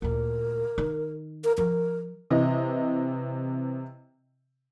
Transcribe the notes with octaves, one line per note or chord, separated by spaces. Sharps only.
D2 A#2 A#4
D#3 D#4
A#4
F3 A#4
C3 E3 D#5